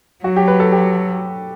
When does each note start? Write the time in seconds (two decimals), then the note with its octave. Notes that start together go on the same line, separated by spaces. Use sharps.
0.24 F#3 F#4
0.36 G4
0.48 B4
0.60 A4
0.72 G4